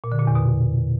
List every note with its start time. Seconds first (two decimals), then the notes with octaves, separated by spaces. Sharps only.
0.04 A#2
0.12 D3
0.19 A#2
0.27 E2
0.35 B2